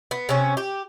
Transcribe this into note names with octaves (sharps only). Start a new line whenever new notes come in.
B3
C3 C#4
G4